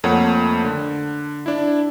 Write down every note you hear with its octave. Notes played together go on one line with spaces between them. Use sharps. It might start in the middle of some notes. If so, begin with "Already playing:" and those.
F2 A3 A#3 C#5 F#5
D3
D4 E4